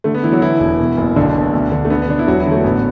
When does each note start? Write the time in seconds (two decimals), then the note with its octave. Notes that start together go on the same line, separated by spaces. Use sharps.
0.04 D3 A3
0.14 B3
0.23 D3 E3 E4
0.32 F#3 F#4
0.42 D3 E3 E4
0.60 E1
0.80 B2
0.97 F#1
1.16 B1 D3 D4
1.35 B2
1.54 D2
1.72 D3
1.85 A3
1.90 D3 B3
2.02 B3
2.09 D3 D4
2.19 E4
2.27 E1 F#3 F#4
2.40 E3 E4
2.46 D3
2.52 A3
2.64 A1 B3